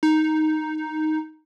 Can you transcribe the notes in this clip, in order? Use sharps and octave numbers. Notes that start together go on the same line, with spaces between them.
D#4